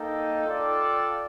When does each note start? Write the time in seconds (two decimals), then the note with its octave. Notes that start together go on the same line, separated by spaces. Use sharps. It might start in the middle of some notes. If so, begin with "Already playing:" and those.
Already playing: A#3 D#4 A4 D#5 G5
0.47 F4 A4 D5 G5